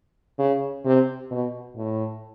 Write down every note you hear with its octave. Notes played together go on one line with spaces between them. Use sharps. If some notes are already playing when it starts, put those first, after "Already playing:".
C#3
C3
B2
A2